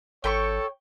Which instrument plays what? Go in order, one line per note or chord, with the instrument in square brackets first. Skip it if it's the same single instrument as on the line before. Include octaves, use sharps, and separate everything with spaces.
[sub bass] G#1 [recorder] A4 [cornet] C#5 [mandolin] G5 B5 C#6